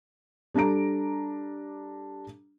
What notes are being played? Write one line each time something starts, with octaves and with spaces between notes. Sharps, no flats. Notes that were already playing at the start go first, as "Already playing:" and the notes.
G3 D4 A4 A#5 D7